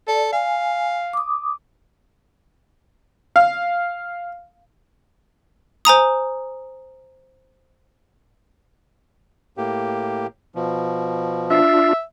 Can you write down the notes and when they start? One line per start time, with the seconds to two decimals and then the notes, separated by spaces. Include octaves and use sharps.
0.08 A4 D5
0.33 F5 G#5
1.13 D6 D#6
3.36 F5
5.85 C5 G#5 A#5 D#6
9.57 A2 A#3 G4
10.55 B2 F3
11.50 D4 F4 E5